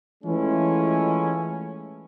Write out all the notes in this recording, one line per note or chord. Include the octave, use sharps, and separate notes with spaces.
E3 G#3 A3 C#4 E4 F4